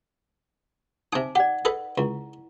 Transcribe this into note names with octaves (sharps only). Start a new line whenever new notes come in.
C3 D#4 G#5 D6 D#6
G4 D5 F#5
G#4 A4 B4
C#2 E4